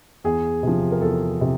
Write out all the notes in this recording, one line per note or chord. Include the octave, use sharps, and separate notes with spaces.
E2 G#4
C3 F3
A#4
E2 A4
C3